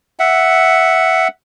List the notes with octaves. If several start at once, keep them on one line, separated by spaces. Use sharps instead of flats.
E5 F#5